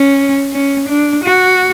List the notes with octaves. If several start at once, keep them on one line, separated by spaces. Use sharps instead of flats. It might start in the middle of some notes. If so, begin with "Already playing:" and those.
Already playing: C#4
C#4
D4
F#4